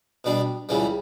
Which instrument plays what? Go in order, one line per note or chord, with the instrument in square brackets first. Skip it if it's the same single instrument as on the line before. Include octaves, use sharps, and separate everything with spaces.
[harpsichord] B2 G3 D4
C#2 C#3 E3 G3